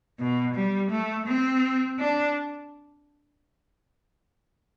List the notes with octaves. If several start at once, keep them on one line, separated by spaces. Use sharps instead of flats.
B2
G3
A3
C4
D4